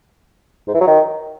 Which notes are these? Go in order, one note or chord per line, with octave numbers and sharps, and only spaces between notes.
G#2
E3
F#3
D#3